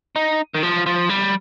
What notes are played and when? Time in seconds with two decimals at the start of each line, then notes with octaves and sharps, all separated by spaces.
0.16 D#4
0.55 D#3
0.63 F3
0.86 F3
1.09 G3